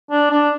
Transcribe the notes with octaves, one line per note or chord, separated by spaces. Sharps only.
D4
D4